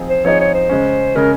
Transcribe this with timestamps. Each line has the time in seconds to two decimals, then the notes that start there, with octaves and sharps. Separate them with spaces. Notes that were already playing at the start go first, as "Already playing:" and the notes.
Already playing: F3 C4 D#4 G#4
0.09 C5
0.25 F3 C4 D#4 G#4 C#5
0.40 C#5
0.54 C5
0.70 C#3 G#3 C#4
1.15 C#3 G#3 C#4 A#4